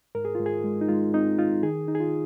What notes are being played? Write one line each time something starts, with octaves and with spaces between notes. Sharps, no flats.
G#2 A#4
G#4
G#2 F4
G#4
G#3
D#4
G#3 F4
C4 D#4
D#4 F4
D#3 G#4
D#4
G#4
F4